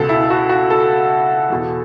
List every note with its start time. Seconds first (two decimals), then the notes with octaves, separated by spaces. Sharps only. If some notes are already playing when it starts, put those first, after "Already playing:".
Already playing: C#2 B2 A4
0.09 E4
0.30 F#4
0.49 F#4
0.70 A4
1.50 E2 B2